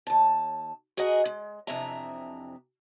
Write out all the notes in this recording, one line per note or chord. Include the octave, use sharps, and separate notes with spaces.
D#2 A5
F#4 G#4 A#4 D#5 F#5 G#5
G#3
F2 C3 E3 D4 E5 A#5